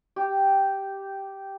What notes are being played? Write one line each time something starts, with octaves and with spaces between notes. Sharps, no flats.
G4